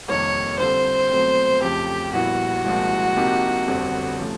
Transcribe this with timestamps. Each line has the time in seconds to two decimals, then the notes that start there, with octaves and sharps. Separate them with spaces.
0.08 F2 C3 D#3 G3 A#3 C#5
0.59 D3 G3 C4 F4 A4 C5
1.11 B2 F#3 A3 C4
1.62 F2 C#3 F3 A3 G4
2.13 A#1 A#2 G3 B3 E4 F#4
2.65 C2 A#2 F3 G#3
3.16 C3 F3 A#3 D#4 G4
3.68 G1 F2 D3 G3 C4
4.19 C3 F3 A3 C#4